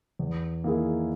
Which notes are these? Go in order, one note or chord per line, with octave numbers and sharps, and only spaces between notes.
E2
D#3 A#3 E4 G#4